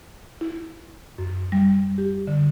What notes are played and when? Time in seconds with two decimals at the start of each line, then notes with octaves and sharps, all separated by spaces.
0.41 E4
1.18 F#2
1.52 G3
1.98 G4
2.27 D3